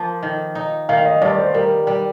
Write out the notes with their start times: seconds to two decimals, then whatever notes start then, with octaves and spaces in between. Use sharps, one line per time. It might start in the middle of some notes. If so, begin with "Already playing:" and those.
Already playing: F3 A#3
0.23 D#3
0.55 D#4
0.89 D#3 F5
1.05 D#5
1.21 G2 D5
1.38 C5
1.54 G3 A#4
1.87 G3